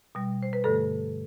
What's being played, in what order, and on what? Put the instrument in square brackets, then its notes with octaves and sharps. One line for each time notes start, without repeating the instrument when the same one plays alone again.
[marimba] B2 G3
C5
B4
G2 D3 A3 A4